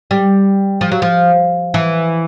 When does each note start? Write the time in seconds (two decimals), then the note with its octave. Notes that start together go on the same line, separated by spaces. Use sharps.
0.11 G3
0.81 F3
0.92 F#3
1.02 F3
1.74 E3